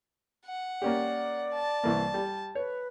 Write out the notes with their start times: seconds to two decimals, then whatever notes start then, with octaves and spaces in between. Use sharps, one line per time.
0.46 F#5
0.82 A#3 C#4 G4 D5
1.55 A5
1.84 C2 E3 A#3
2.14 G3
2.55 B4 C#5